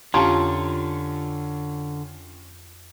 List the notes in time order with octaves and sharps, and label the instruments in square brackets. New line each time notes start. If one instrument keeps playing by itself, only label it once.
[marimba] F2 [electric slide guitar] D3 [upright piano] C#4 F4 G4 [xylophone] A5 A#5 C6